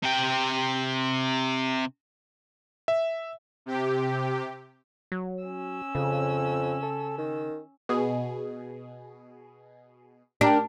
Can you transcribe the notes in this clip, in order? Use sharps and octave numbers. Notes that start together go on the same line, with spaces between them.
C3 G5
E5
C3 G4
F#3
C#4 E6
F2 C#3
A4
D#3
B2 G#4
D4 G4 A#4